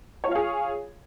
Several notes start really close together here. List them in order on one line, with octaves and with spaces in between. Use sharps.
C#5 F4 F5 G#4